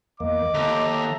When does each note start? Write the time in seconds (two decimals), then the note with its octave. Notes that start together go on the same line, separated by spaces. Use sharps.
0.20 E2 A#3 D#5 D6
0.54 D#2 A4 E5 A#5